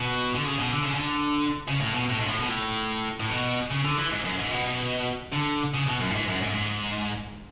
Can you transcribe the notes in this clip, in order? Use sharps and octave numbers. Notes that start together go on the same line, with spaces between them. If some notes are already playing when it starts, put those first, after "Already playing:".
Already playing: B2
D3
C#3
B2
D3
C#3
D3
C#3
A2
B2
A2
G#2
A2
B2
A2
A2
B2
C#3
D3
E3
G#2
F#2
G#2
B2
D3
C#3
B2
F#2
A2
G#2
F#2
G#2
G#2